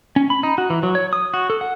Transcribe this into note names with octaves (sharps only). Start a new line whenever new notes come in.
C#4
B5
D#4
F#4
E3
F#3
C#5
D#6
F#4
A4
F#5